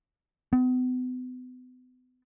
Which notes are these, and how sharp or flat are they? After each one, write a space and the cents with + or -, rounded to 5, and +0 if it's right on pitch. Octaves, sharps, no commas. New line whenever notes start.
B3 +40